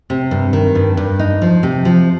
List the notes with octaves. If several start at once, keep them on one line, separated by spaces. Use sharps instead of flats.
C3
G2
D#3
G2
G2
D#4
F3
C3
F3